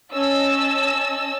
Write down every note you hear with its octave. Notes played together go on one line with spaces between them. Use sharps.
C#4 D#5 A5 E6